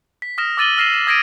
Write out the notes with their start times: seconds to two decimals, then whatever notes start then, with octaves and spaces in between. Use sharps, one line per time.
0.22 B6
0.38 D#6 F6 A#6 E7
0.57 D6 E6 A6 D#7 F#7 G7
0.77 E6 F6 A#6 C7 D#7 E7
0.94 E7
1.07 D#6 G#6 A#6 B6 D7 D#7